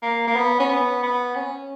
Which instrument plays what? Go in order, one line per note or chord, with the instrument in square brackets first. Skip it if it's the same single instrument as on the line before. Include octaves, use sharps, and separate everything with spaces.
[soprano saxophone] A#3
A#3
B3
C#4
B3
B3
C#4